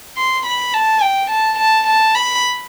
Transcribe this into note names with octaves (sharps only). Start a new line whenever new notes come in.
C6
B5
A5
G5
A5
A5
A5
B5